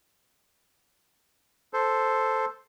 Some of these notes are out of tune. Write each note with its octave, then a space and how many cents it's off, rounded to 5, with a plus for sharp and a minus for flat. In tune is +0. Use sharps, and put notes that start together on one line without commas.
A4 +0 C5 +0